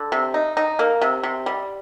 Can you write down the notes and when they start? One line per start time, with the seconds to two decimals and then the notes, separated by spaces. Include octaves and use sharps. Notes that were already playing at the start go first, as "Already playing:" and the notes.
Already playing: D3
0.12 C3
0.34 D#4
0.57 D#4
0.79 A#3
1.02 C3
1.23 C3
1.46 G3